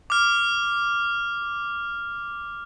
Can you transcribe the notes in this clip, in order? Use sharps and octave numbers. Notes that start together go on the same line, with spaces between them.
D6 F6